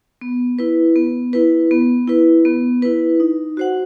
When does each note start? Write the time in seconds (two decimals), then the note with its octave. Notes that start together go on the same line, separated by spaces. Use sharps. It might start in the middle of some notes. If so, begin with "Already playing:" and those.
0.21 B3
0.59 E4 B4
0.96 B3
1.33 E4 B4
1.71 B3
2.08 E4 B4
2.45 B3
2.82 E4 B4
3.20 D#4
3.57 F#4 C5 F#5